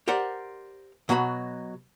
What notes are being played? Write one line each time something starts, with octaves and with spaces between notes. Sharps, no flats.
G4 A#4 C5 D5 F#5
B2 F#3 F#4 A#5 B5